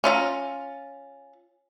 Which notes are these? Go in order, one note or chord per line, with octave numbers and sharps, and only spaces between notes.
C#4 F4 E5 A#5